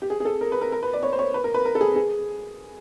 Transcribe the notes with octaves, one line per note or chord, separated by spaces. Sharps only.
G4
G#4
G#4
A4
A#4
B4
A#4
A#4
B4
D5
C#5
C5
C#5
B4
A#4
B4
A#4
A4
G#4
G#4